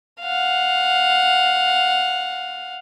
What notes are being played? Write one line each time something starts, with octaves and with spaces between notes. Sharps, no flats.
F5 F#5